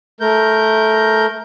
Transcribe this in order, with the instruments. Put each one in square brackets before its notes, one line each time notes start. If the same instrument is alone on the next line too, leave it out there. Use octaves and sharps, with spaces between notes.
[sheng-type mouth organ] A3 A#4 G6